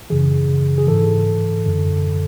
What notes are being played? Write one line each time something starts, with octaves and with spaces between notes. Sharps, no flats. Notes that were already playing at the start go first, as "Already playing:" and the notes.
F#2 C#3 E3 G#4
G#4
G#2 E3 A4
F#2 D3